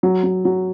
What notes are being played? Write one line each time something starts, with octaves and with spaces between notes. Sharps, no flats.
F#3
F#3
F#3